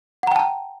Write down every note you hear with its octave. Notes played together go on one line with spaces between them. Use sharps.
F#5 G5 A5 A#5